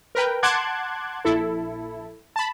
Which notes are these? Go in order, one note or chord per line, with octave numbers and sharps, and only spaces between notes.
A#4 B4 G5
F#5 A5 C6 D6 F#6 G#6
A#1 E4 A4
A5 B5